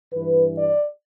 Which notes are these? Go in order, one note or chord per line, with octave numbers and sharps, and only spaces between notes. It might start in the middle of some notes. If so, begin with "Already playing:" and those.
G2 E3 B4
D5